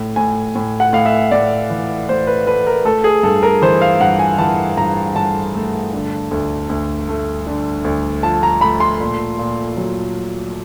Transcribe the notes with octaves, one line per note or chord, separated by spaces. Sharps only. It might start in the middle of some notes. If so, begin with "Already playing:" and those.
Already playing: A2
A2 G#5
A2
F#5
A2 F5
E5
A2 D5
E3
A2 C5
B4
A3 B4
A#4
A3 A4
G#4
G2 A4
A#4
E3 C5
F5
G2 F#5
G#5
E3 A5
G2 A#5
G2 A5
A3
D3
D2
D2
A3
D3
D2
F3 A5
A#5
A3 B5
C6
A#2
A#2
F#3